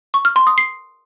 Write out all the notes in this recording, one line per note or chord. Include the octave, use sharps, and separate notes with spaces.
C#6
F6
C6
D#6
C7